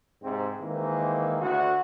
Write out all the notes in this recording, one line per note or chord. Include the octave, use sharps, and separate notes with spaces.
G#2 C3 C4
D#3 E3 G#3 A#3 C4
D2 F#4